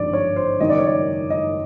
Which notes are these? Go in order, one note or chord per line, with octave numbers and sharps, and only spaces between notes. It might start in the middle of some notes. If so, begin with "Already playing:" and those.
Already playing: G#1 G2 D3 F3 A#3 D5
C#5
C5
F#1 F#2 D#3 F#3 D#5
D5
C#5
D5
D#5